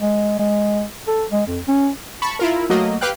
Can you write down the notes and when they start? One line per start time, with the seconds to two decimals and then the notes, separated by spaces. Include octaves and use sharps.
0.01 G#3
0.39 G#3
1.07 A4
1.31 G#3
1.47 F2
1.68 C#4
2.22 A5 B5 C#6
2.39 E4 F4 A#4
2.70 F#3 A3 A#3 F#4 D#5
3.01 G4 B4 F5 G5 F#6